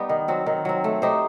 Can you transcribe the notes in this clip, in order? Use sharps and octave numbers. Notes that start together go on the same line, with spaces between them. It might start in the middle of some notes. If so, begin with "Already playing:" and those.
Already playing: G3 B3 D#4 G4
D#3
F#3 C4 F#4
D#3
F#3 C4
A3
D#4 G4 C5